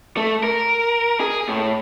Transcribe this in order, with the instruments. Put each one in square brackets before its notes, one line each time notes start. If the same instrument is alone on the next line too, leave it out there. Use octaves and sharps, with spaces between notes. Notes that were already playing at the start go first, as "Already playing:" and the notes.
[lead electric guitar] A3
A#4
G#4
A2